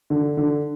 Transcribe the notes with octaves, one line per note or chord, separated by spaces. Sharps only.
D3
D3